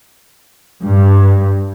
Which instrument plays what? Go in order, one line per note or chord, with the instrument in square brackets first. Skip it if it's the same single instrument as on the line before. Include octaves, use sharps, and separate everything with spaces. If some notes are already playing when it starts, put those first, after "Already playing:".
[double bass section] G2